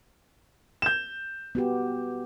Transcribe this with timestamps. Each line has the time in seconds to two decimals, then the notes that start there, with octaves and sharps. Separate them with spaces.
0.82 G6 E7
1.55 B3 F#4 G4